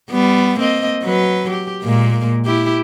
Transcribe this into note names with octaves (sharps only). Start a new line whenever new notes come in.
G3 B3
A#3 C4 D#5
F#3 B4
G4
A#2 G#3 A#3
E4 G4